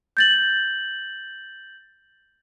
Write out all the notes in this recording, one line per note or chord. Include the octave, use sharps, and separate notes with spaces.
G6 A6 F#7